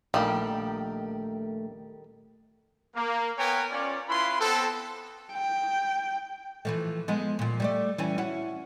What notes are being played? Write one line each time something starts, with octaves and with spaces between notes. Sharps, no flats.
A#1 D#3 G3 A3 A#3 G4
A#3
B3 A#4 B4 C#5 G5 G#5
C#4 F4 D5
C#4 E4 F4 B4 B5 C6
B3 C4 A4
G5
E3 F3 A3
F3 G#3 B3
A#2 F3
G3 A3 D5
E3 G3 C#4
C#4 E4 F#4